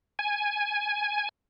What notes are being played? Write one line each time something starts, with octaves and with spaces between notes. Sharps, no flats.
G#5